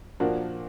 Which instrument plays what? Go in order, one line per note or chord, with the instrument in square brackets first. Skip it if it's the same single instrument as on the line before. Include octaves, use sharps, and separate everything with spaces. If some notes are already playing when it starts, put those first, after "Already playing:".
[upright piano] A#2 F3 A#3 D4 F#4